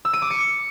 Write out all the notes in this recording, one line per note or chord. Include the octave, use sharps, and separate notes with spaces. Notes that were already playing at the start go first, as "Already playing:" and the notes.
E6
D#7
D6
C#7